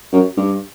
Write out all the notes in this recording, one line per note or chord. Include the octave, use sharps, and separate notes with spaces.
F#2
G2